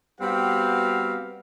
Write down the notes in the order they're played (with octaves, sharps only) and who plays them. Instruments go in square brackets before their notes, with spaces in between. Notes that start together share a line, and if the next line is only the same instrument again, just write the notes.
[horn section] G3 B3 C4 F#4 G4 F5